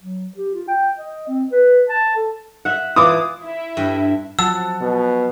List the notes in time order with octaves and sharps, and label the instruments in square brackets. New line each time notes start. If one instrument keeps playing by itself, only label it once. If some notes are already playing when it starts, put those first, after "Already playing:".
[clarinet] F#3
G4
F4
G5
D#5
C4
B4
A5
A4
[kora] E5 F#5
[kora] E3 E4 F4 [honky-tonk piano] D6 D#6
[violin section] E4 E5
[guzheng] G2
[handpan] F3 F#3 [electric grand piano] F#5 A5 [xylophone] E6
[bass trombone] B2